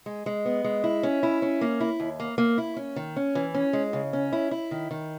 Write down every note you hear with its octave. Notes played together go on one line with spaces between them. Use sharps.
G#3
G#3
B3
G#3
E4
C#4
E4
C#4
A#3
E4
D#2
A#3
A#3
E4
C#4
D#3
C#4
E3
C#4
G#3
C#3
C#4
E4
E4
D#3
D#3